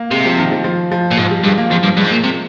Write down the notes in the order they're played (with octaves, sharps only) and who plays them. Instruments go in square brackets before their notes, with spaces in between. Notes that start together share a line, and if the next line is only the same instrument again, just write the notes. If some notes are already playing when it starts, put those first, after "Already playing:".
Already playing: [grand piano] A#3
[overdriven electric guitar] C3 [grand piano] G#3
[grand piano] F3
D#3
F3
F3
F3
[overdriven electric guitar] A#2
[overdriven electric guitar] G#2 [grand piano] F3
[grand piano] G3
[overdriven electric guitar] G2 [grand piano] G#3
[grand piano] A#3
[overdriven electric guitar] F2 [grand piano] F3
[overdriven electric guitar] G2
[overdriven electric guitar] G2 [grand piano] G#3
[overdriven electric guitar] G#2
A#2
C3